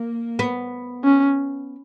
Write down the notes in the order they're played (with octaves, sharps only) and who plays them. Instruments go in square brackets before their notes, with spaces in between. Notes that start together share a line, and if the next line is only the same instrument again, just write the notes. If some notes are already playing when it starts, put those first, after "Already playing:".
Already playing: [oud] A#3
B3
[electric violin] C#4